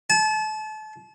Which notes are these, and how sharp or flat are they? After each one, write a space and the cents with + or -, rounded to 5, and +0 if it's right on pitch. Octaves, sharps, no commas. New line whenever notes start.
A5 -35